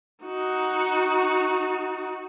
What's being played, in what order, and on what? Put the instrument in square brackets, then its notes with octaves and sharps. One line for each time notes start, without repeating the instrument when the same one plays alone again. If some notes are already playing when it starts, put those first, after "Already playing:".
[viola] D#4 F#4